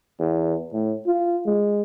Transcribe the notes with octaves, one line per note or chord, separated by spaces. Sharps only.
E2
A2
F4
G#3